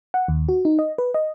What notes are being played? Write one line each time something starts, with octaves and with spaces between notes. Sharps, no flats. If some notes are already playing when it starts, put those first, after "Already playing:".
F#5
D#2
F#4
D#4
D#5
B4
D#5